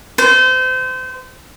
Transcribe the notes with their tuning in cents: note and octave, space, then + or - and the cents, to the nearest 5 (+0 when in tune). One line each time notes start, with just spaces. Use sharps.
C5 -30